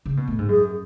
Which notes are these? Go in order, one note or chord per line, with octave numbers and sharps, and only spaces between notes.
C#3
B2
A2
G#2
F#2 G#4